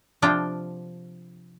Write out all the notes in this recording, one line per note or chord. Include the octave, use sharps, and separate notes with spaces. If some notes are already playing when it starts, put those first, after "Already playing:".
C3 F3 D4 F4 G5